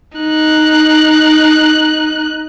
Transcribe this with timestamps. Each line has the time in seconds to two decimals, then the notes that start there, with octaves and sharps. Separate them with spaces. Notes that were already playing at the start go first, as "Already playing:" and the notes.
0.17 D#4 F#6